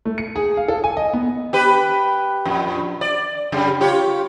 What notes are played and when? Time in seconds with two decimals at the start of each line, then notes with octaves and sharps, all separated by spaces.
0.05 A3
0.18 C#7
0.36 G#4
0.57 F5
0.68 A4
0.84 G#5
0.97 D#5
1.13 B3
1.53 G4 B4
2.45 F2 A#2
3.01 D5
3.52 F#2 C#3 G3
3.81 F4 G4 C#5